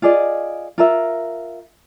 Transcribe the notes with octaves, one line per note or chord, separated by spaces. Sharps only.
F4 G#4 D5 D#5
F4 A#4 E5